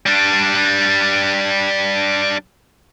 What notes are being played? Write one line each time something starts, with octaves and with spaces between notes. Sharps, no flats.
G3 D4